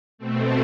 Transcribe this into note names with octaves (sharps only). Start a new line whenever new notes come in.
B2 A3 C4